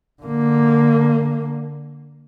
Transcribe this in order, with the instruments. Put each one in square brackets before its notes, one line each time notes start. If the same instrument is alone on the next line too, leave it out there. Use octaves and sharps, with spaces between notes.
[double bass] D3 A#3